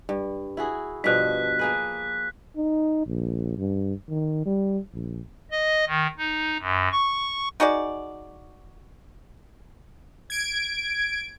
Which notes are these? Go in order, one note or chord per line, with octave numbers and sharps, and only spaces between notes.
G2
E4 F#4 G#4
G2 B2 F3 F#6 B6
A#3 G#4 B4
D#4
A#1
G2
D#3
G3
A#1
D#5
D#3
D#4
F#2
C#6
D#4 F#4 G#4 D5
G#6 D7